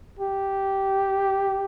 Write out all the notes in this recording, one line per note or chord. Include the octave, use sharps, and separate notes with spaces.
G4